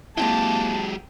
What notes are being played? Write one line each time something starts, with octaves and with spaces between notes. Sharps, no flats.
F#3 G#3 A#3 C4 E4 G4 A5